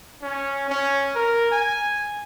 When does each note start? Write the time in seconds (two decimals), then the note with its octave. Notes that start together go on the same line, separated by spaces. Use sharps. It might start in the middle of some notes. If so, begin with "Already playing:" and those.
0.22 C#4
0.70 C#4
1.15 A#4
1.52 G#5